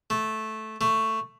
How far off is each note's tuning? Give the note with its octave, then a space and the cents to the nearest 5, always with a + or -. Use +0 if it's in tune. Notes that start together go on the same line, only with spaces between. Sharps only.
A3 -10
A3 +10